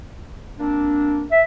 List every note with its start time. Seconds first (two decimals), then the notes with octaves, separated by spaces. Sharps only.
0.59 A#3 C4 D4
1.31 E5